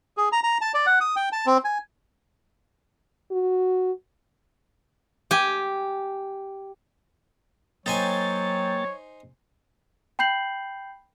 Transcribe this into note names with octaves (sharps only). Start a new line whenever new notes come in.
G#4
A#5
A#5
A5
D5
F#5
D#6
G5
A5
C4
G#5
F#4
G4 G#5
F#3 A#3 D#4 C5 C#5 G5 G#5 A6
G5 B5 G6 C7 F#7